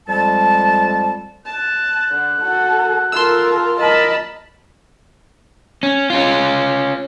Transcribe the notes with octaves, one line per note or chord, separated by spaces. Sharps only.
F2 G3 G#3 A5
A5 F#6
D3
F#4 A4
F4 A4 A#4 C6 E6
A#4 D#5 A5 B5
C#4
C#4 F4